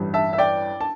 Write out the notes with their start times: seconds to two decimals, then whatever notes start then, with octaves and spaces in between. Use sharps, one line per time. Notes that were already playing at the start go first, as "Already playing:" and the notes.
Already playing: A1 G2 G3
0.14 E5 A5
0.33 E5
0.38 D5 G5
0.81 A5